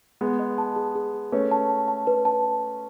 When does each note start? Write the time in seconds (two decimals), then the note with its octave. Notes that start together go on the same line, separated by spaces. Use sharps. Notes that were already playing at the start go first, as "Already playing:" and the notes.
0.21 G#3 B3 G#4
0.39 D#5
0.58 A5
0.76 G#4
0.95 G#4
1.14 G#4
1.32 A3 C#4 B4
1.51 A5
1.69 A5
1.88 A5
2.07 B4
2.25 A5